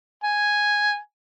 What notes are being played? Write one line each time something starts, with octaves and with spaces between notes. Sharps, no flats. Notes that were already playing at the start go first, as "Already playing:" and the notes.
G#5